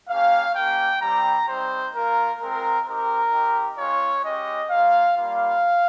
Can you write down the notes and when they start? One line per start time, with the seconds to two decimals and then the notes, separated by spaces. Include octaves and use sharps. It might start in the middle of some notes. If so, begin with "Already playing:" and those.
0.09 A#3 C#4 G4 F5
0.55 A#3 C#4 G4 G5
1.01 G3 C4 G4 A#5
1.48 G3 C4 D#4 C5
1.94 A#3 F4 A#4
2.40 G#3 C4 F4 A#4
2.86 C4 D#4 G4 A#4
3.32 C4 D#4 G4
3.78 G#3 C#4 F4 C#5
4.24 G#3 C#4 G4 D#5
4.70 A#3 F4 F5
5.16 G3 A#3 F4 F5